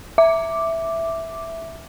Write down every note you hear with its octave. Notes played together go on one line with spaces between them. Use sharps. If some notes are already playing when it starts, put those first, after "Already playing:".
E5 D6